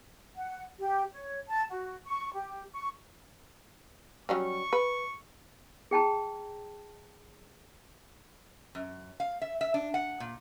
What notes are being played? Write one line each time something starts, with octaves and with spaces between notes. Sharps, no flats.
F#5
G4
C#5
A5
F#4
C#6
G4
C#6
F#3 G3 C#4 C#6
B4
G#4 G5 A5 A#5
F#2
F5
E5
E5
D4
F#5
A#2